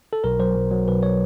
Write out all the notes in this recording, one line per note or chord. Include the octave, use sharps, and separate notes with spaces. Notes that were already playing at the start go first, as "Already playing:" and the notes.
A4
B1 A#4
F#3 C5
B1
F#3
B1 B4
C#5